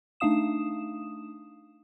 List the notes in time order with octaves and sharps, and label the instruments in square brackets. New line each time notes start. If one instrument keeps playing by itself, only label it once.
[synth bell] A3 D4 D#4 F5 D#6 E7